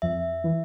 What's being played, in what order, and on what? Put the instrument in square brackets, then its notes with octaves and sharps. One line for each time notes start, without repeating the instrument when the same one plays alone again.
[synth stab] F2 [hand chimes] E5
[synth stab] E3